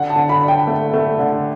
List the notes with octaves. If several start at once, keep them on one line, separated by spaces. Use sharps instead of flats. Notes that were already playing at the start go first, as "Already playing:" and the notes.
Already playing: D3 F#5
A5
D3
B5
D4
G5
A3
A3
D3